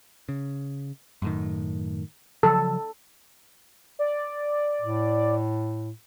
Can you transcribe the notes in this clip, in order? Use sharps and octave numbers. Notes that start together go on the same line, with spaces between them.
C#3
F#2 A2 D#3
C#3 F3 F#3 A4
D5
A2